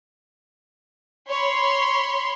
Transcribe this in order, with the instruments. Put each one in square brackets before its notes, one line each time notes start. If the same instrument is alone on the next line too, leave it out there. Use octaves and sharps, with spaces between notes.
[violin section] C#5 B5 C6